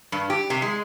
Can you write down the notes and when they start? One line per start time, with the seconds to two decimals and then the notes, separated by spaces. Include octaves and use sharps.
0.12 G2
0.30 G4
0.50 C3
0.62 G#3